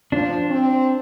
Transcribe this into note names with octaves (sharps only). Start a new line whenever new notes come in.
F3 D4
C4